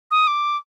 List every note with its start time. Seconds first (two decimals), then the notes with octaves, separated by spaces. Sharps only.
0.11 D#6
0.27 D6